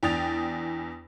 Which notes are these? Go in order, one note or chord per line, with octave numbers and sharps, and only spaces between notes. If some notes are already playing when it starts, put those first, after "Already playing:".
E2 D4 G5 D#6 A6 F7